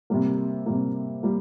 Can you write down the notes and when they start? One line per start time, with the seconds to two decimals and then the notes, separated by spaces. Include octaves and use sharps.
0.10 C3 G3 A#3
0.66 C3 G3 A#3
1.23 G3 A#3